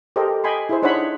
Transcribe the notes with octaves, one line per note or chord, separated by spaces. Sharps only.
G4 A4 A#4 C5 D#5
D#5 G5 G#5 B5 C6
E4 G#4 C5
D4 D#4 C5 C#5 F#5 B5